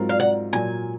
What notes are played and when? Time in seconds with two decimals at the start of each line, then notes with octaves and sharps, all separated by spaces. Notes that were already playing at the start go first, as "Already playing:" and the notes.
Already playing: G#2 F#3 C4 F4 A#4
0.09 F5
0.20 F#5
0.53 A#2 F#3 A#3 G#5